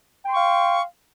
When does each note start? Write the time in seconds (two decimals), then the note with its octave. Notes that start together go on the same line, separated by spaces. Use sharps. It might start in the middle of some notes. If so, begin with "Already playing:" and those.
0.24 G5
0.28 C6
0.32 C#6
0.36 F5